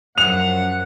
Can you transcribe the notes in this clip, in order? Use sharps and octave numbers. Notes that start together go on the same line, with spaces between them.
F#2 F3 F#5 F7